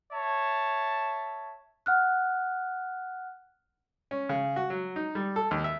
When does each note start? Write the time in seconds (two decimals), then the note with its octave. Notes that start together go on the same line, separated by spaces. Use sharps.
0.13 C#5 E5 A5
1.86 F#5 F6 F#6
4.11 C#4
4.29 C#3
4.56 F#4
4.70 F#3
4.96 D#4
5.15 G3
5.36 A4
5.51 D#2
5.64 E5